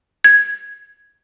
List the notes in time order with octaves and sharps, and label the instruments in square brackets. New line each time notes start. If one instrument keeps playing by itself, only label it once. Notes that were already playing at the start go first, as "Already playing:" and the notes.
[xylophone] G#6